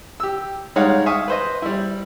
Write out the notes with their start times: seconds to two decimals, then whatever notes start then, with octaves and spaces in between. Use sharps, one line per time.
0.20 G4 E6
0.76 G3 G#3 D#4 C#5 F5 F#5
1.06 E5 F5 G#5 C#6 D#6
1.28 B4 C5 D#5
1.62 G3 E4